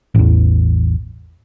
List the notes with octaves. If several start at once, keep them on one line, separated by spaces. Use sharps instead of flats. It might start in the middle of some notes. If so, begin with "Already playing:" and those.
A1 E2